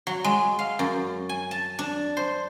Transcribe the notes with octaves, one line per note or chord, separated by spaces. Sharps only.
F#3
G#3
F5
F#2
G#5
A5
D4
C5